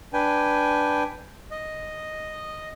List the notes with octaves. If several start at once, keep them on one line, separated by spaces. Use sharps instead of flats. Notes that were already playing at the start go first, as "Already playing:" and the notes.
D4 B4 G5 G#5
D#5